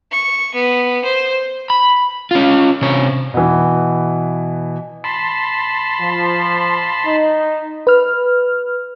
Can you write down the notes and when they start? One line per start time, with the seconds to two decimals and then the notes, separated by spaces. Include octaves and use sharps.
0.11 C#6
0.54 B3
1.04 C5
1.70 B5
2.31 C#4 F4
2.82 C3 C#5
3.34 B2 E3
5.04 A5 B5 C6
6.01 F3
7.06 D#4
7.87 B4 F6